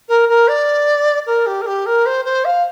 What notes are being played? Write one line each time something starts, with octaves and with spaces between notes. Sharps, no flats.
A#4
A#4
D5
A#4
G4
A#4
G4
A#4
C5
C5
F5